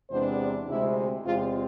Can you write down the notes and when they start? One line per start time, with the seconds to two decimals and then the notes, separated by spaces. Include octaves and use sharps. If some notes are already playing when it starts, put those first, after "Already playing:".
0.10 E2 C3 G#3 B3 D4 C5
0.67 D2 C3 G#3 C4 E4
1.25 E2 C3 G#3 C4 F4